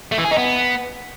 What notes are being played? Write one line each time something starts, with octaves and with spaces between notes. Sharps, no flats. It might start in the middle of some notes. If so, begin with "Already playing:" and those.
A3
E3
G#4
D#4
B3